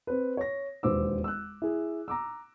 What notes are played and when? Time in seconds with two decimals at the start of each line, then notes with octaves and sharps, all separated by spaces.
0.07 C4 B4
0.37 C#5 A#6
0.83 E1 D#2 B4 C5 D6 E6
1.24 E6 F#6
1.62 E4 G#4
2.08 A#5 D6 E6